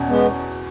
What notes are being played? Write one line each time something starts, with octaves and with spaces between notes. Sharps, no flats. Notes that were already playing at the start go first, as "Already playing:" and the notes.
Already playing: E2 B2 C#4
G#3 B3